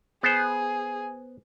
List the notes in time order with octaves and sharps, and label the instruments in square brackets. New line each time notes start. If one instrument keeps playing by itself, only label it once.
[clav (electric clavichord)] B3 C5 [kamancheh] G#4